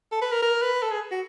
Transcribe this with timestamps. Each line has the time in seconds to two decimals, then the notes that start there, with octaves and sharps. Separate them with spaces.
0.12 A4
0.22 B4
0.32 A#4
0.43 A#4
0.62 B4
0.82 A4
0.91 G#4
1.12 F#4